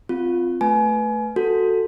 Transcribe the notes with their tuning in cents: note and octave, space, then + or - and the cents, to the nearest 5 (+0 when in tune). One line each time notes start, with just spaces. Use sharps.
C4 -25 F4 +0
A3 +5 B4 -5 G#5 +30
F#4 +0 A4 +10